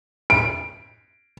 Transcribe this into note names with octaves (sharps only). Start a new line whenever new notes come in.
D7